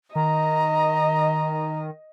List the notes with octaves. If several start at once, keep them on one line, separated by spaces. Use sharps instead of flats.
D#3 D#5 A#5